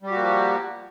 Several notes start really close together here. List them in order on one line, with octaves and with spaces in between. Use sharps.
G3 G4 F#4 A#3 F3